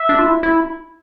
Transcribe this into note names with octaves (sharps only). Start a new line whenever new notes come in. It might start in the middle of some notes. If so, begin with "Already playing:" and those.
Already playing: E5
D4
F4
E4
E4